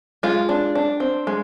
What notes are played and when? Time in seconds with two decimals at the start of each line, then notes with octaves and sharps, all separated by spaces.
0.23 G#3 F4
0.49 D4
0.75 D4
1.00 C4
1.27 G#3